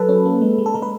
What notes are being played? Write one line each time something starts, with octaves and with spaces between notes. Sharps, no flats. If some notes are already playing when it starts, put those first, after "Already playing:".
Already playing: F#3 A4 B4
C#4
A#3
G#3
G#3
A4
G#3 A#4
B4